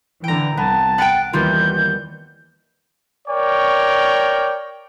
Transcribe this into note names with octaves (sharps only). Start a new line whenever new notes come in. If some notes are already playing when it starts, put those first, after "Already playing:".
D3 E3 G5 A#5
C2 B3 A5
B3 F#5 G5 A6 D7
D#2 D#3 E3 G3 B3 F4 G6
A#4 C#5 D5 G5